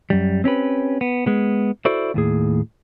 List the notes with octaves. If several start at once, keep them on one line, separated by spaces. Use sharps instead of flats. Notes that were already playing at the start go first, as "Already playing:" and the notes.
F#2 G3
C4 C#4 G4 B4
B3
G#3 B3
E4 F#4 A4 C5 D5
D#2 A2 G#4